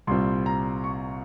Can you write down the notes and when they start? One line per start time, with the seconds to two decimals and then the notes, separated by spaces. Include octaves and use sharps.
0.07 C2 A#2 G3 C4 C6
0.46 A#5
0.84 C#6